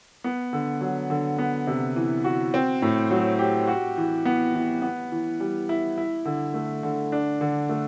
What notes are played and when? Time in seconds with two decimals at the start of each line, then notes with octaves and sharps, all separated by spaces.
0.24 B3
0.53 D3
0.81 F#3
1.10 D3
1.39 B3
1.67 C3
1.96 E3
2.24 F#4
2.54 C4
2.82 A2
3.11 F#3
3.39 G4
3.68 F#4
3.97 E3
4.25 B3
4.54 E3
4.82 B3
5.12 E3
5.40 G3
5.69 E4
5.98 E4
6.25 D3
6.54 A3
6.83 D3
7.12 D4
7.41 D3
7.69 A3